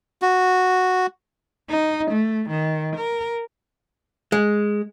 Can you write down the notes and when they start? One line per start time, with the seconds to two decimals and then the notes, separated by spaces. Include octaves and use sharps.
0.22 F#4
1.70 D#4
2.11 A3
2.50 D#3
2.97 A#4
4.32 G#3